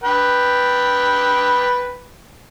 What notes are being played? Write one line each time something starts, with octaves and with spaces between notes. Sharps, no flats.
B4 G5